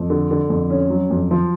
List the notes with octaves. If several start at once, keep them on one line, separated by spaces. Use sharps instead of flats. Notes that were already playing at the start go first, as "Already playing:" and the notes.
Already playing: F2
D3
D3
F2
C#4
F#3
F2
F3